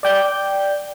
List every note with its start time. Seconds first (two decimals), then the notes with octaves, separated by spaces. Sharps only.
0.03 D5 G5 G6